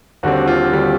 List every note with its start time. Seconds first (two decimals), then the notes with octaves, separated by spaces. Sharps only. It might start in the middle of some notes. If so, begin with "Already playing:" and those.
0.23 D#2 D3 G3 C4 F#4
0.47 F4
0.72 D#2 D3 G3 C4